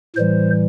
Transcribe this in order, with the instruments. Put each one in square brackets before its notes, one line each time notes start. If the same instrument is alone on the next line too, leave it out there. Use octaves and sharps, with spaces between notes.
[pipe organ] A2 E3 G3 C5